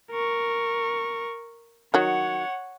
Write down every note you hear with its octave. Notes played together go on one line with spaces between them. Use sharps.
A#4 C#6
D#3 F#3 C#5 F#5